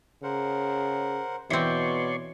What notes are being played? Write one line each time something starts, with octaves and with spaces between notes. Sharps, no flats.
C#3 A#4 C5 F#5
B2 E3 C4 C#5 D5 C6 C#6